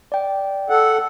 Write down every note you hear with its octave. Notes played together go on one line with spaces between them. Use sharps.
D5 G5
A4 F#5